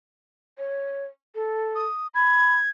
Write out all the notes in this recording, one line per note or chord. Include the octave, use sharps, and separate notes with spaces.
C#5
A4
D#6
B5 G#6